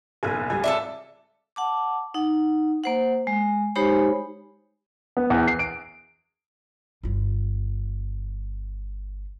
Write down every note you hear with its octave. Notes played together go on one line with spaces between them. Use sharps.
F#1 B1 G#5
C#2 G3 G#5
A4 C5 D5 E5
F#5 A5 D6
D#4 F#5
A#3 C5 F#5
G#3
G#3 D#4 G4 C5 C#5 B5
B3
E2
C7
D7
G1 F4